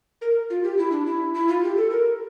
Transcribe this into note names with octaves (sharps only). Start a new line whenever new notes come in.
A#4
F4
G4
E4
D4
E4
E4
F4
G4
A4
A#4